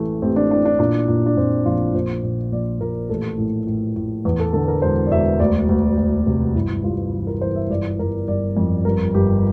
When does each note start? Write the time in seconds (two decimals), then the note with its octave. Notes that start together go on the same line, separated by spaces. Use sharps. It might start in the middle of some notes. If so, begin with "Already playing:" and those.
Already playing: A1 E3 A3
0.22 A1 C4
0.36 D4
0.50 E3 D4
0.65 D4
0.79 A#2 D4
1.08 A#2
1.26 D4
1.37 A#2 C4
1.65 A#1 F4
1.94 A#2 C5
2.24 A#2
2.51 A#1 D5
2.80 A#2 A#4
3.09 A1 A4
3.38 A2
3.67 A2
3.96 A2
4.25 E2
4.40 A4
4.53 D3 A4
4.68 A#4
4.82 E1 C5
5.07 D5
5.11 E1 E5
5.40 D2 D5
5.69 D2
5.98 D2
6.27 C3
6.55 G1 E4
6.84 G2 F4
7.13 E3
7.27 A#4
7.41 E3 C5
7.56 E5
7.70 G1 D5
7.99 G1 A#4
8.28 G1 D5
8.57 F2
8.85 G1 A#4
9.14 G1 G4